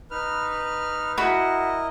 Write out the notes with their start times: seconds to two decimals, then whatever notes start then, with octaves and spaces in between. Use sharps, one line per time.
0.11 D#4 B4 F6
1.18 E4 F#4 A#4 D#5 B5